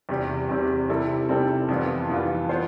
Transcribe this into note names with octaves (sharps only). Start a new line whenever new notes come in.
E2 C3 G3 C4 G4
E2 C3 G3 C4 G4
C3 G3 C4 E4 A4
C3 G3 C4 E4 A4
F2 E3 G3 B3 F4
F2 E3 G3 B3 F4
B3 F4 C5